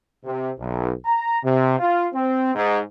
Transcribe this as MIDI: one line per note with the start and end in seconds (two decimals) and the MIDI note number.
0.25 0.50 48
0.59 0.91 35
1.05 1.39 82
1.43 1.79 48
1.79 2.07 65
2.14 2.52 60
2.55 2.80 44